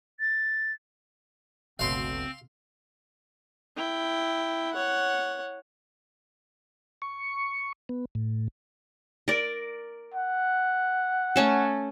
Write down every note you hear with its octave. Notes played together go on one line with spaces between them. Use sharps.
A6
G1 C#2 B2 F#3 A3 C4 F5 C6
E4 G5
C#5 F#5
C#6
B3
A2
A#4 D5
F#5
A3 C#4 A4